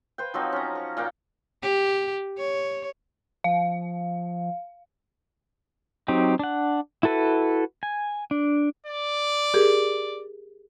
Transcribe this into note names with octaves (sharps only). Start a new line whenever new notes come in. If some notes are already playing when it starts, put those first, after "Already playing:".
B4 C5 G5
F3 F#3 C4 D#4
C#4 A#5
C#6
A#2 A#3 F#5 G5
G4
C#5
F3 F5
F#3 C4 D#4 G4
D4 F#5
E4 F#4 A4 B4
G#5
D4
D5
G4 G#4 A#4